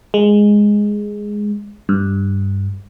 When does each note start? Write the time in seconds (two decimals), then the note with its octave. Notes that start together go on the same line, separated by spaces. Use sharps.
0.14 G#3
1.89 G2